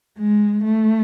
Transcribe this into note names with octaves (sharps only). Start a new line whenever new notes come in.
G#3
A3